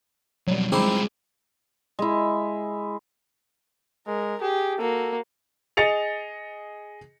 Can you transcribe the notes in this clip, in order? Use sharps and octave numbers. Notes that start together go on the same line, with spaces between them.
F2 B2 F#3 G3
G2 F3 G#3 C4 D#4 E4 D6
G#3 E4
G#3 A#4
G4 G#4
A#3 F#4 A4
G#4 D#5 A6 C#7 F7